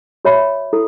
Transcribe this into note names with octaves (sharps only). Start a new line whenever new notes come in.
F#4 C#5 E5 B5
E4 A4